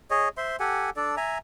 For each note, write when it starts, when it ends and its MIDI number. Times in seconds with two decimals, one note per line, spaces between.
0.10 0.29 68
0.10 0.29 73
0.10 0.29 75
0.37 0.56 72
0.37 0.56 76
0.37 0.56 84
0.60 0.90 67
0.60 0.90 69
0.60 0.90 78
0.60 0.90 80
0.96 1.16 62
0.96 1.16 69
0.96 1.16 74
1.17 1.38 76
1.17 1.38 80
1.17 1.38 82